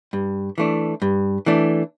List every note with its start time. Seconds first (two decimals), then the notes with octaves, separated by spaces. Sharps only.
0.13 G2
0.58 E3 A3 D4
1.02 G2
1.46 E3 A3 D4